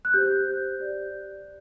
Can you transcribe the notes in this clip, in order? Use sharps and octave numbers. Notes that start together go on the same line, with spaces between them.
F#6
G4 C5 G6
G4 D5